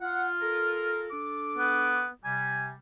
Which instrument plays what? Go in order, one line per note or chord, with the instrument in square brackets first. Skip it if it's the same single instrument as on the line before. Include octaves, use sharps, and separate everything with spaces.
[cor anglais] F4 [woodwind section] F#5
[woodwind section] A4 A#4
D4 A4 D6
[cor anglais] B3
[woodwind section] C3 G3 [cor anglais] G#5